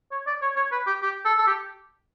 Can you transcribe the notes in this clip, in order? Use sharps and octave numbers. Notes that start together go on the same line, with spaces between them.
C#5
D5
C#5
C#5
B4
G4
G4
A4
A4
G4